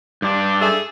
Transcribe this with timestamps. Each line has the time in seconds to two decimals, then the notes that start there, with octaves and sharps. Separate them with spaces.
0.22 G2 D4
0.62 G#4 A4 E5